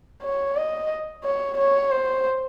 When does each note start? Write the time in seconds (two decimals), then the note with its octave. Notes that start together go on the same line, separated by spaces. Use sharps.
0.23 C#5
0.56 D#5
1.24 C#5
1.57 C#5
1.91 C5